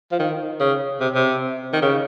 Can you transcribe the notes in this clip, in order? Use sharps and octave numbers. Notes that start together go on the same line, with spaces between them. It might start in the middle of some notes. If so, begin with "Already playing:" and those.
F3
D#3
C#3
C3
C3
D#3
C#3